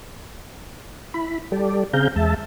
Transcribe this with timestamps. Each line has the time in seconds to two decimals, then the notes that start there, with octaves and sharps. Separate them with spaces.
1.14 E4 B5
1.52 G3 G4 A4 D5
1.93 C#3 C4 G#4 F5 A#5 G6
2.16 E2 G#3 E5 A5